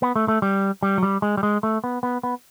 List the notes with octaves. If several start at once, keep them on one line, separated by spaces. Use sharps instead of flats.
B3
A3
A3
G3
G3
F#3
G3
G#3
G3
G#3
A3
B3
B3
B3